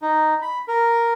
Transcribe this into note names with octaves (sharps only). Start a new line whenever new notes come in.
D#4
B5
A#4